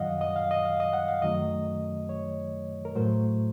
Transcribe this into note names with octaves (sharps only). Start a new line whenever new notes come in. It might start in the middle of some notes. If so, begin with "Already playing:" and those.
Already playing: F#2 D#3 F#3 D#5 F5 F#5
D#5
F5
D#5
F5
D#5
F#5
F5
F#2 D#3 F#3 A3 D#5
C#5
A#4
A2 F#3 A3 C5